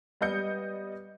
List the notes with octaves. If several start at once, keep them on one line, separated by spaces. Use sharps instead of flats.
G3 B3 D#5 G6 C#7